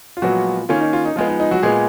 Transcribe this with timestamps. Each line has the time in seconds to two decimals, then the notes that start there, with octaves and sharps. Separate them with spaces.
0.17 F4
0.22 A#2 F3 F#3 G#3 B3 F#4
0.69 D#3 A#3 C#4 F4
0.81 D#4
0.93 F4
1.05 D#4
1.16 F3 G#3 B3 F4
1.28 D#4
1.40 D#4
1.51 F#3 F#4
1.63 A#2 G#3 B3 G#4